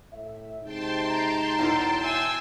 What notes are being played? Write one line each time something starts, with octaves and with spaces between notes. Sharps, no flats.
A2 E5
C3 G#3 D#4 G5 A5 C6
A#5
B1 E2
E5 G#5 E6